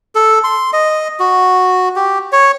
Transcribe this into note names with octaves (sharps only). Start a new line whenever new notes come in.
A4
C6
D#5
F#4
G4
C#5